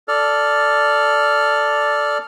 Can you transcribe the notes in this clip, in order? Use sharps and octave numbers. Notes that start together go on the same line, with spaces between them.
A4 D5 F6